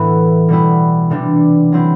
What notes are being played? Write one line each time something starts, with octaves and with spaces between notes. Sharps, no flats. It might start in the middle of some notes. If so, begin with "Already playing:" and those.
Already playing: A2 E3 B3 E4
B2 G3 B3 E4
C3 E3 G3 D4
F#3 C4 E4